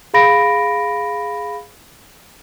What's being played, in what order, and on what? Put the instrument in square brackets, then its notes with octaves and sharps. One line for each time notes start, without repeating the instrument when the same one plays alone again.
[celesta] G#4 F5 B5 A#6 D7